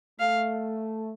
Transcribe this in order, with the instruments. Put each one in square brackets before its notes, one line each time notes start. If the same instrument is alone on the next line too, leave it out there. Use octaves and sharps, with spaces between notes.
[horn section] A3 [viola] F5